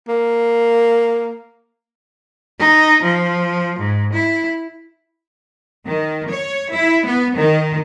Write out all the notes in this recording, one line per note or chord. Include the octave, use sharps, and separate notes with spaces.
A#3
D#4
F3
G#2
E4
D#3
C#5
E4
B3
D#3